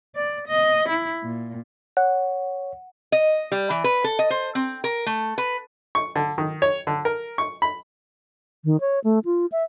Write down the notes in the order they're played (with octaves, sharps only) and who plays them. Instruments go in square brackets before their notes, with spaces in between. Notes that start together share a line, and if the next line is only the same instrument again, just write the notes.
[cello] D5
D#5
E4
A#2
[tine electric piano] C#5 [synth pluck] F#5
[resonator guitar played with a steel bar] D#5
G3
E3
B4
A4
D#5
C5
C4
A#4
A3
B4
[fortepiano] C#6
D3
D#3
C#5
D3
A#4
C#6
B5
[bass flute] D#3
C#5
A3
F4
E5